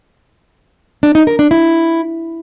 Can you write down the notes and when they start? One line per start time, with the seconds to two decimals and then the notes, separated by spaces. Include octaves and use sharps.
1.03 D4
1.15 D#4
1.27 A#4
1.39 D4
1.51 E4